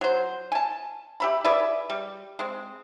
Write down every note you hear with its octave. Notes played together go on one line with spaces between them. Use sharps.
F#3 C5
G#5 A5
G4 E5 B5
G#4 B4 D5 E5
G3
G#3 C4